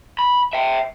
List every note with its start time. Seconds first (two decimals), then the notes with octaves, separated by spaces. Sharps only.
0.19 B5
0.53 E5 G5